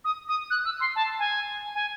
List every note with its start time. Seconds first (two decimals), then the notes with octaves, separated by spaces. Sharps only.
0.05 D#6
0.28 D#6
0.50 F#6
0.65 E6
0.80 C6
0.96 A5
1.19 G#5
1.75 G#5